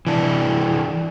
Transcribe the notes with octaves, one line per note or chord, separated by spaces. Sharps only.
E3 D4